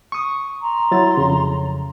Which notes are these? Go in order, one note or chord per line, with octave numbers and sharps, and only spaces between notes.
C#6 D#6
A#5 C6
F#3 E4 A6
F2 C#3